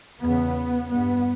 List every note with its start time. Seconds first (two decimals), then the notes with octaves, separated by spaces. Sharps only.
0.22 E2 C#3 B3
0.90 G2 B3